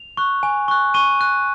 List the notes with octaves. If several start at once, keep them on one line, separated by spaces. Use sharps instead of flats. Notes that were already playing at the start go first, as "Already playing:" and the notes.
Already playing: F7
C#6 F#6
G#5
C#6 F#6
C#6 D#7
F#6